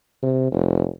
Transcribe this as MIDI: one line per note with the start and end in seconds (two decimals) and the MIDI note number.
0.22 0.50 48
0.51 0.88 29